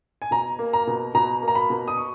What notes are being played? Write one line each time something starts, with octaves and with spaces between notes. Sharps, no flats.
G#5
B2 A#5
A#3
A#5
B2
B2 A#5
A#3
A#5
B5
B2
D#6
C#6